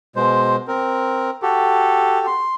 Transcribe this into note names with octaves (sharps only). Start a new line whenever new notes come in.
B2 G#3 C5
C4 A#4
F#4 G4 A4
C6